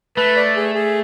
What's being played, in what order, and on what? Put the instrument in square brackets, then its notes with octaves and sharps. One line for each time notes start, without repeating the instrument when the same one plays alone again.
[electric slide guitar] A3 [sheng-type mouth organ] B4
[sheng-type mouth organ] D5
G#4
G#4